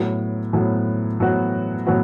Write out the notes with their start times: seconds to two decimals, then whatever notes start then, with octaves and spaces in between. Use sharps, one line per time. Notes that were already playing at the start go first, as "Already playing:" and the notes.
Already playing: A2 F#3 B3 F#4
0.53 A2 F#3 B3 F#4
1.20 A2 F#3 B3 F#4
1.87 A2 F#3 B3 F#4